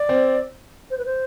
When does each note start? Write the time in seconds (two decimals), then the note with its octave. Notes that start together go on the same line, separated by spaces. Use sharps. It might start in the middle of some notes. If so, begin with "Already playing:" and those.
Already playing: D5
0.09 C4
0.91 C5
0.98 B4
1.06 C5